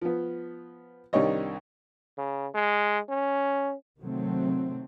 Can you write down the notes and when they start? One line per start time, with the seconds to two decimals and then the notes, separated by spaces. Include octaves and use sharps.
0.02 F3 B3
1.13 C2 D#3 D4 C#5 D#5
2.18 C#3
2.55 G#3
3.09 C#4
3.99 C3 D#3 F#3 A3 C4